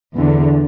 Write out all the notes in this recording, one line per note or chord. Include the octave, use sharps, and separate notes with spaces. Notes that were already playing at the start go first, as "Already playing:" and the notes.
E2 D3